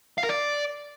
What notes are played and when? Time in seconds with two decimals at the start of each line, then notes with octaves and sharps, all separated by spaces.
0.18 F5
0.23 A#4
0.29 D5